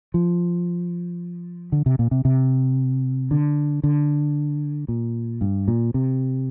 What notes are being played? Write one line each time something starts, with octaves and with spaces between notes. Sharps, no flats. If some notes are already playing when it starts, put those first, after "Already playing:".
F3
D3
C3
A#2
C3
C3
D3
D3
A#2
G2
A#2
C3